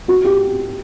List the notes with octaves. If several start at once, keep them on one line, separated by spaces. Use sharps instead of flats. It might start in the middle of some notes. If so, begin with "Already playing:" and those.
F#4
G4